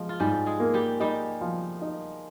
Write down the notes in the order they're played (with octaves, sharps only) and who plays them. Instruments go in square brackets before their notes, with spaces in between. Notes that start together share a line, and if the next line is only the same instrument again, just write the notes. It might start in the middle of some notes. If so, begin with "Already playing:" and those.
Already playing: [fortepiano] F3 [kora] G#3
[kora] F4
[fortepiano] G#2 [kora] G3 G4
[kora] G#3 G#4
[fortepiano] A#3
[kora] G3 G4
[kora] G3 G4 [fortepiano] D#4
[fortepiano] F3
D#4